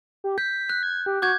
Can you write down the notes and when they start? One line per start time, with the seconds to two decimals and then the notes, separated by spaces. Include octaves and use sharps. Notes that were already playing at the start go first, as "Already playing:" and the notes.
0.24 G4
0.38 G6 B6
0.70 F#6
0.83 G#6
1.06 G4
1.22 F#4 D6 G6 G#6